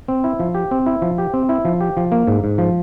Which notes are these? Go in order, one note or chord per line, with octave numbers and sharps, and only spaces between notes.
C4
E4
F3
G4
C4
E4
F3
G4
C4
E4
F3
G4
F3
A#3
G#2
G#2
F3